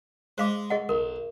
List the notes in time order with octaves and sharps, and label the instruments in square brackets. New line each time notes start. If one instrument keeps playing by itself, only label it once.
[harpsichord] G#3 [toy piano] C5 F5 D6
[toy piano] G#4 D#5 F#5
[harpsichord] B1 [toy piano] A#4